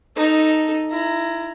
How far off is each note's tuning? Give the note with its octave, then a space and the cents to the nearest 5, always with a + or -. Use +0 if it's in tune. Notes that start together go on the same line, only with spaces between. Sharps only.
D#4 +0 A4 +0
E4 +25 A#5 -5